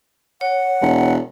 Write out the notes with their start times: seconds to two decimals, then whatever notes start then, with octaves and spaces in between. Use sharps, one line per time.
0.41 C#5 F#5
0.81 E1